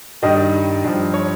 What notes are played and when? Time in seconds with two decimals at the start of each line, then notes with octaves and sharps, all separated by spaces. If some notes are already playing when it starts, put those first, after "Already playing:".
0.22 G2 D#3 G3 D#5
0.84 G2 F3
1.14 C#5